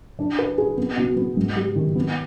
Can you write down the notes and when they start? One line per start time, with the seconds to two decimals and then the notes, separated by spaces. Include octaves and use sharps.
0.19 D4
0.39 B4
0.58 G#4
0.78 B3
0.97 B2
1.16 B3
1.37 G#2
1.56 G3
1.76 D#3
1.96 B3